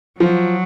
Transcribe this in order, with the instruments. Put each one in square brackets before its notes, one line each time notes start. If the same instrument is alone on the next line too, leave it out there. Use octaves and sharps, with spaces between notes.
[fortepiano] F3 [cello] F#3